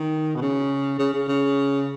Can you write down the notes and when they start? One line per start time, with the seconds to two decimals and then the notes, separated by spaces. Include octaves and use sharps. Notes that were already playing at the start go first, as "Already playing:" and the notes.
Already playing: D#3
0.36 B2
0.42 C#3
0.99 C#3
1.13 C#3
1.28 C#3